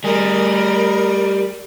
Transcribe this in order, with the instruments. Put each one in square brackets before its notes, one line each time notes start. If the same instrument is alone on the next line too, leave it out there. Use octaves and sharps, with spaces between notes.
[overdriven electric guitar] G3 G#4 [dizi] A#4